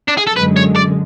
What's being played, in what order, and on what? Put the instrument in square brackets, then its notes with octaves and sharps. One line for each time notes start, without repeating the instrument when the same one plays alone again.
[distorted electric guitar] D4
G#4
A4
[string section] F#2 D3 G#3 [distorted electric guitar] B4
[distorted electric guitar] C#5
D5